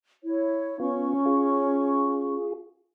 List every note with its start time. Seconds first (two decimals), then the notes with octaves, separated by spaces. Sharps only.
0.23 E4 C#5
0.80 B3 C#4 F4 C#6
1.26 F4 G#4